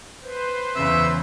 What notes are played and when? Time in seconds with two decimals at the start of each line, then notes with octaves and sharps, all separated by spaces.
0.22 B4 C5
0.76 E2 C#3 E5